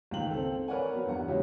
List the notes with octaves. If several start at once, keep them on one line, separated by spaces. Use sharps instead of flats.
C#2 D#3 G5 F#7
C4 A4
A#4 B4 C#5 D5 F#5 G#5
F#3 B3
E2 G2 F#5
C#3 F#3 G#3 E4 G4